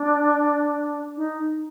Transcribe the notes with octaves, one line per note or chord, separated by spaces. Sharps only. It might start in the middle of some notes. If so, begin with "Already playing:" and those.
Already playing: D4
D#4